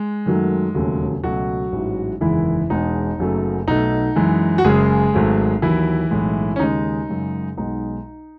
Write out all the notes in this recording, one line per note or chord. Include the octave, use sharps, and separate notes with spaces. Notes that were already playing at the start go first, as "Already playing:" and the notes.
Already playing: G#3
F#2 D#3 F#3 A3
E1 D#2 C#3 F#3 A3
C#2 B2 F#3 A3 F#4
A1 G#2 E3
F#1 E2 D#3 E3 G#3 E4
E1 E2 B2 G#3 D#4
F#1 F#2 C#3 F#3 A3
B1 B2 A3 D#4
F#2 E3 G#3
F#4
F#1 F#2 C#3 G#3 G#4
G#1 G#2 F#3 A3
D#2 D#3 E3 F#3 E4
B1 A2 G#3
C#4
D#2 C#3 G#3 D#4
F#2 C#3 G#3
B1 B2 G#3 D#4